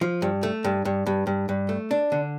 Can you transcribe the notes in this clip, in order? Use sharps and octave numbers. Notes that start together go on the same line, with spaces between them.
F3
G2
A3
G2
G2
G2
G2
G2
A3
D4
D3